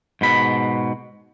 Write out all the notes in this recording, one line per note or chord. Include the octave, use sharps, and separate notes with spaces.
G#2 B2 B5